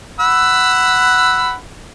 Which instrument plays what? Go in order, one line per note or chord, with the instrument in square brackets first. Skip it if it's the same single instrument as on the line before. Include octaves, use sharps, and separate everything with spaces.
[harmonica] F#5 B5 E6